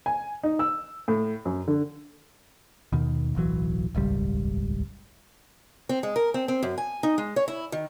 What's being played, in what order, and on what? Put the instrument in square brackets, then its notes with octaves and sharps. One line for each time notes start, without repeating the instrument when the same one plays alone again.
[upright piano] G#5
D#4
E6
A2
F#2
D3
[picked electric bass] D#2 B2 D#3
D1 B1 E3 F#3
D#1 G#1 C#2 G3
[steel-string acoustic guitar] C4
G#3
A#4
C4
C4
F#2
G#5
D#4
G#3
C#5
E4
D#3